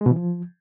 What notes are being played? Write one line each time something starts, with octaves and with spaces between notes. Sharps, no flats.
G#3
B2
E3
F3